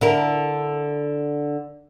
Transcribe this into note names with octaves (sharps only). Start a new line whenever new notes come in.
D3 E4 A#4